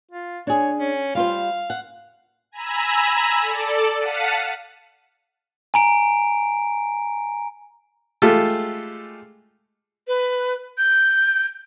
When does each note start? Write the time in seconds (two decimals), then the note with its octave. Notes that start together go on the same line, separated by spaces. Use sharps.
0.11 F4
0.47 D4 G#4 C#5
0.79 C#4
1.15 G3 F4 C5 F5
1.70 F#5
2.52 G#5 A#5 B5 E6
3.41 A4 D5
3.97 F5 F#5 A5 B6 C#7 D#7
5.74 G#5 A#5 D7
8.22 G#3 A3 F4 G4 A4
10.07 B4
10.78 G6